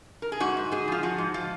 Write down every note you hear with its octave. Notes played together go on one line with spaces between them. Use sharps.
A#4
G#4
G#2 F#4
G#2
G#2 G#4
F3 F4
F3 F#4
G#2
F3 F4